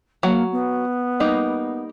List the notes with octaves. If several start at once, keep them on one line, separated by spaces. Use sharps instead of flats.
F#3 A#3 F#5
B3
G3 A#3 D#4